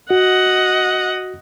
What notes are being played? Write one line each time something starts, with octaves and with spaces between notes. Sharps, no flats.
F#4 D#5 F#5